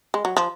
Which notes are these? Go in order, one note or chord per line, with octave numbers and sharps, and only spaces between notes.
G#3
F#3
F3